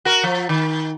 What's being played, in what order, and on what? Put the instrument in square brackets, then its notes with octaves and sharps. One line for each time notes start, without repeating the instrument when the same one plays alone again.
[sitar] F#4 A#4
F3
D#3